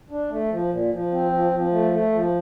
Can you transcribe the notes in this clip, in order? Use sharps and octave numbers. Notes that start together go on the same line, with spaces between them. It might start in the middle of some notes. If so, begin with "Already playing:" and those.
D4
A3
F3
A#2
F3
C4
F3
F3
A3
A3
F3